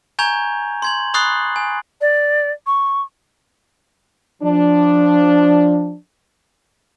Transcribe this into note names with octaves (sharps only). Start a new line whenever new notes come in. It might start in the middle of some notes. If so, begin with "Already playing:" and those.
G#5 A#5 C#6 G6 G#6 F7
C6 G#6 F#7
B5 C#6 D#6 F#6 A6 C7
G#5
D5
C#6
F3 D4